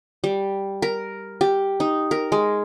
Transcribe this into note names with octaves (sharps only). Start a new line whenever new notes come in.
G3
A#4
G4
D#4
A#4
G#3